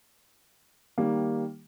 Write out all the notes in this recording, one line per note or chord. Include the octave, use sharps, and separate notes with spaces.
D#3 G3 A#3